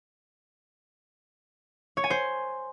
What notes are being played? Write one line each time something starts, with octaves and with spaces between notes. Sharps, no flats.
C#5
G#5
C5